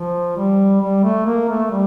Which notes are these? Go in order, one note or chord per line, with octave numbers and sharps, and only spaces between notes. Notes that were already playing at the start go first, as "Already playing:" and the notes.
Already playing: F3
G3
G3
A3
A#3
A3
G3